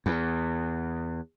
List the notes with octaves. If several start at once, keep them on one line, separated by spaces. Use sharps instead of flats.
E2